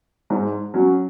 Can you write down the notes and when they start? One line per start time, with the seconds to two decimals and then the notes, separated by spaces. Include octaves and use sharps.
0.30 G#2
0.74 F#3 C#4